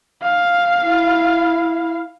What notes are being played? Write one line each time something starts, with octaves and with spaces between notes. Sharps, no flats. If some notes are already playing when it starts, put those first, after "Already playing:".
F5
E4